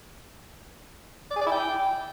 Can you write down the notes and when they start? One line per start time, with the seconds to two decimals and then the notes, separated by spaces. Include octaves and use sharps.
1.31 D5
1.36 G#4
1.41 D5
1.47 E4
1.52 G5